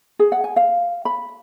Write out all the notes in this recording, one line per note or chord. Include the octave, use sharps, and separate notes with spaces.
G#4
F#5
G#5
F5
B5